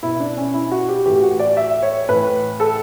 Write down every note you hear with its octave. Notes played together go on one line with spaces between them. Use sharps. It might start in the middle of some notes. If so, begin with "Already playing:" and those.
B2 E4
D4
C#4
E4
F#4
G4
A2 E3 G4
F#4
D5
E5
C#5
A2 E3 B4
A4